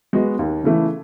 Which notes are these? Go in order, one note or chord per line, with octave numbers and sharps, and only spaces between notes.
G#3 B3 F#4 B4
D#2
C#3 E3 A3 E4